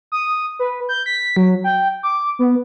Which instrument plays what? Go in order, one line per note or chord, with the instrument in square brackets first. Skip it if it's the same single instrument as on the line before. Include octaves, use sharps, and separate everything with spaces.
[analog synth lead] D#6
B4
G6
B6
F#3
G5
D6
B3